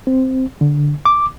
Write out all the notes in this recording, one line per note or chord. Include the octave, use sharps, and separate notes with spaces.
C4
D3
D6